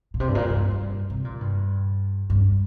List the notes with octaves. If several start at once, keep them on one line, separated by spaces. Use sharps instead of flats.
A#2
C3
G2
A#2
G2
C3
A#2
G2
G2